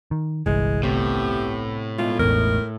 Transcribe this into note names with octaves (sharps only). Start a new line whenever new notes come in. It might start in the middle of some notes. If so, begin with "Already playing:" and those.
D#3
G1 C2 E3 G#3
A2 C3 A3 B3 G4
G#2 B2 A3 F4
A1 E2 A#4